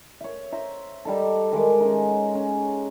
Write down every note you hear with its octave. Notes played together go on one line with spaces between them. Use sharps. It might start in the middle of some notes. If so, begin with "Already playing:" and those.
C#5 E5
C5 E5 A#5
G3 D#4 A4
D#3 G#3 E5 D6
C#4 D#4
C#4